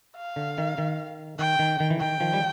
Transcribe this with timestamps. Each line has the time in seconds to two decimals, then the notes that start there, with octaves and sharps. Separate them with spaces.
0.17 F5
0.36 D3
0.58 D#3
0.78 D#3
1.39 D#3 G5
1.59 D#3
1.80 D#3
1.90 E3
2.00 D#3 G5
2.20 D#3 F3
2.33 G3